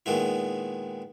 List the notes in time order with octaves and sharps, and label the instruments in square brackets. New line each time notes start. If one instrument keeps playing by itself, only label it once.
[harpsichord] A#2 D#3 G#3 B3 E4